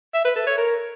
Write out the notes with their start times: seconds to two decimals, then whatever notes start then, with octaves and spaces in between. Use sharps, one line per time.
0.14 E5
0.25 B4
0.36 A4
0.47 C#5
0.58 A#4